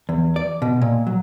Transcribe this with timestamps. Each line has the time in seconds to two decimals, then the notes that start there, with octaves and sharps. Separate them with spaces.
0.09 E2
0.36 D5
0.62 B2
0.82 A#2
1.07 F#3